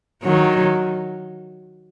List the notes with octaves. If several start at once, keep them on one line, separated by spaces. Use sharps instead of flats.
D#3 F#3